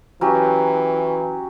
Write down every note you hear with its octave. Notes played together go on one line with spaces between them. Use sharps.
E3 F#3 C#4 G4